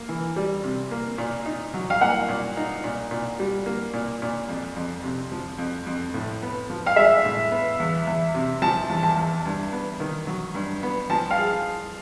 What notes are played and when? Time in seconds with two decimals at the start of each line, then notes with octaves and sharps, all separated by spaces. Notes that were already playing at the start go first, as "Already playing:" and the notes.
Already playing: A#3
0.09 E3
0.36 G3
0.63 C3
0.91 A#3
1.18 A#2
1.46 D#4
1.74 F#3
1.90 F5
2.01 A#3 F#5
2.29 A#2
2.57 D#4
2.84 A#2
3.11 A#2
3.39 G3
3.66 A#3
3.94 A#2
4.22 A#2
4.49 F2
4.76 F2
5.04 C3
5.32 F3
5.59 F2
5.87 F2
6.14 A2
6.42 B3
6.70 F3
6.86 F5
6.96 G#3 E5
7.25 A2
7.51 B3
7.80 E2
8.07 E2
8.35 C3
8.62 F3 A5
8.90 E2
9.03 A5
9.17 E2
9.45 G2
9.72 B3
10.00 D#3
10.27 F#3
10.55 G2
10.83 B3
11.10 F3 A5
11.31 F5
11.38 G#4